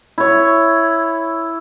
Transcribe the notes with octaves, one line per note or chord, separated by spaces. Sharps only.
E4 C#5